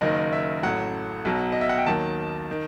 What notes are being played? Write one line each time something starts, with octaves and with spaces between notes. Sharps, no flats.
F#1 F#2 D#3 D#5
E5
A1 A2 F#3 F#5
B1 B2 F#3
D#5
E5
F#5
G5
D#2 D#3 F#3 A5
D#3